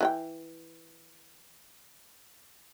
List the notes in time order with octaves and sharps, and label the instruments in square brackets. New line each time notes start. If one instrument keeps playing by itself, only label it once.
[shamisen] E3 E4 G5